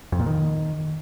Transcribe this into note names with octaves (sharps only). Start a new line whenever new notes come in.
F2
A#2
D#3